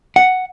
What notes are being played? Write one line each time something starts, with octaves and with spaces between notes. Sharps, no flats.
F#5